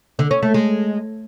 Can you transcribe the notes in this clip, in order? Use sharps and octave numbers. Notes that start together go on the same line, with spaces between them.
D3
C#4
A3
G#3